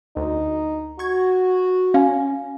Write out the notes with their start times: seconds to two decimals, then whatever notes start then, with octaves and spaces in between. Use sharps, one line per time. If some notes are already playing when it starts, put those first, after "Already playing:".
0.16 D2 D#4
0.99 F#4 C#6 G#6
1.94 C#4 F5 G#5